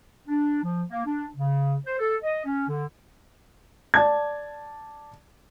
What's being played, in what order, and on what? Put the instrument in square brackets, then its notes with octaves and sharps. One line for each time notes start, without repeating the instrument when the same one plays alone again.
[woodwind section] D4
F3
A#3
D4
C#3
C5
A4
D#5
C#4
D3
[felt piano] D5 A5 G#6